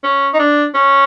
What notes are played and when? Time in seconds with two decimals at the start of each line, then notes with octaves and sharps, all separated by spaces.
0.03 C#4
0.34 D#4
0.39 D4
0.74 C#4